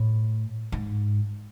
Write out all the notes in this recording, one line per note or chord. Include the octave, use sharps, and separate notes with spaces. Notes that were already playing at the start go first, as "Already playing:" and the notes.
Already playing: A2
G#2